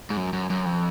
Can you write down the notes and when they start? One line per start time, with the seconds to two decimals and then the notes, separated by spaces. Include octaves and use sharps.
0.10 G#2
0.17 F#2
0.33 F#2
0.50 F#2
0.66 F2